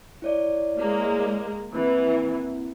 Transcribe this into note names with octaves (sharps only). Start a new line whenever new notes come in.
E4 C#5 D5
G#3 A#3
E3 A#3 C4 E4